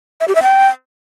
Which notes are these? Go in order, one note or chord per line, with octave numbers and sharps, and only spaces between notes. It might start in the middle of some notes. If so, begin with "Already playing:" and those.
E5
G4
E5
G5